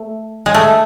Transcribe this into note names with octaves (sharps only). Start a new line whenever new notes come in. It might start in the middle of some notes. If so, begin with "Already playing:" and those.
Already playing: A3
G#3
A3